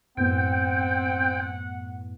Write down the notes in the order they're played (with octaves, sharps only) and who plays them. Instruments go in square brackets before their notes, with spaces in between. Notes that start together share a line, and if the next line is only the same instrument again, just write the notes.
[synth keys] F#2 A2 B3 [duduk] C4 [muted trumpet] F#5 [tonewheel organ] G5